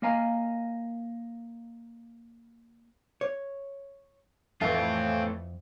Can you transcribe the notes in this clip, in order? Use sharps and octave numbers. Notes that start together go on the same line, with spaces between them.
A#3 A#4 D#5 F5 G#5 A#5
C#5
F2 A2 E3 A3 C4 F4